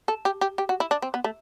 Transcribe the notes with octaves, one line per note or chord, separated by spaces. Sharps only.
A4
G4
G4
G4
F#4
E4
D4
C4
B3
A3